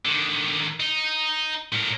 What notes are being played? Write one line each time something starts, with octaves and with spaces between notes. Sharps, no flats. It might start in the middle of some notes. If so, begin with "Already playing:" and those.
D3 D#3
D#4
A2 A#4